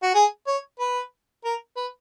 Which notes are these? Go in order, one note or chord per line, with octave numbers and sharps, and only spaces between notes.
F#4
G#4
C#5
B4
A#4
B4